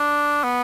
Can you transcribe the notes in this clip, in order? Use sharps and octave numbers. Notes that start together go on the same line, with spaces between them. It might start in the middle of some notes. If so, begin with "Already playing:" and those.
Already playing: D4
B3